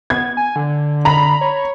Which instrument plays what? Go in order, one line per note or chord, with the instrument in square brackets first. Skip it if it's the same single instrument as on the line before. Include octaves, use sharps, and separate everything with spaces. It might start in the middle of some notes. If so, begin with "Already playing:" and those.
[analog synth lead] B3 [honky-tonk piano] G#6
[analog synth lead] G#5
D3
[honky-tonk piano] A#5 B5
[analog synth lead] C#5